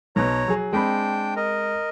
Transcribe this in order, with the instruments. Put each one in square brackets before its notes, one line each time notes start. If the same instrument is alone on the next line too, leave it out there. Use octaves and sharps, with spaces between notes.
[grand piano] B1 B2 [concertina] C#5 A#5
[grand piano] F#3 G#4
[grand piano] G#3 C4 B5 [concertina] D4 G5
[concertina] A#4 D#5